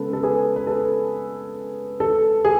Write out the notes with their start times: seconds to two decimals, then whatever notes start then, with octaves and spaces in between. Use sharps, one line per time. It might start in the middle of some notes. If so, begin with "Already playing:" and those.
Already playing: C#3 G#3 B3 A4 B4
0.13 A4
0.23 G#4 B4
0.56 B4
0.67 A4
2.00 A4
2.45 G#4